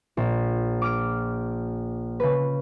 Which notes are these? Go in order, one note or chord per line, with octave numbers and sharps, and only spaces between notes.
A#1
D6 F6 D7
C#3 B4